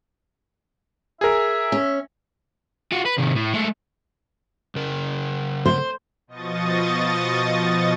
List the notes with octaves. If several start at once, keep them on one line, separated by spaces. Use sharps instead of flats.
G#4 A#4 E5
C#4
F4 F#4
B4
C3 D#3
A2
G#3 A3
C#3 A#4
C5
B2 F3 D#5 C#6 D#6 A6